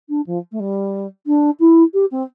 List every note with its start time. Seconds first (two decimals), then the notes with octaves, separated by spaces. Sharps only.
0.09 D4
0.26 F3
0.51 A3
0.59 G3
1.27 D4
1.60 E4
1.93 G4
2.11 C4